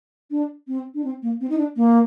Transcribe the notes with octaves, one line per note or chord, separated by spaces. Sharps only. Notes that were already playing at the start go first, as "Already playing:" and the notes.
D4
C4
D4
C4
A#3
C4
D#4
D4
A#3